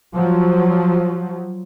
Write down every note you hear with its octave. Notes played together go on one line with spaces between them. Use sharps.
F3 F#3